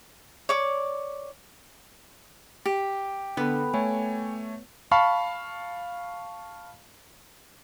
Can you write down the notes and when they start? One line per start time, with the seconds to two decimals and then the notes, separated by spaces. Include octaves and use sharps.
0.49 C#5 D5 D6
2.66 G4
3.37 D3 B3 A4 B5
3.74 A3 C#5 G#5
4.91 F5 A5 B5 C#6